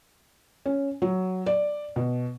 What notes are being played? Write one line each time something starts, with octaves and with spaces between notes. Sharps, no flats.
C#4
F#3
D5
B2